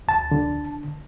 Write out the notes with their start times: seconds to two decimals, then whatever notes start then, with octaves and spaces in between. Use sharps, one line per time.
0.08 D2 A5
0.31 D3